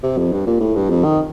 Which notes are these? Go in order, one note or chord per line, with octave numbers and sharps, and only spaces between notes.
C3
F2
G2
A#2
A2
G2
F2
D#3